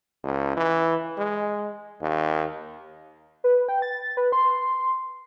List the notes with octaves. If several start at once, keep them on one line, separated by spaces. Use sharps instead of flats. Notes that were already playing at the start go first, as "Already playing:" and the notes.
C#2
E3
G#3
D#2
B4
G5
A6
B4
C6